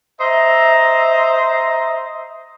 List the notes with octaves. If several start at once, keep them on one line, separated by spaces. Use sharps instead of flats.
C5 D#5 E5 A#5